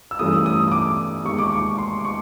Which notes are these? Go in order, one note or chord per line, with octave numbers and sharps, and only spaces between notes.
E6
G2 E3 A3 C#4 D#6
E6
D#6
D#6
D6
D#2 D#3 G#3 C#6
D6
C#6
C6
D6
C#6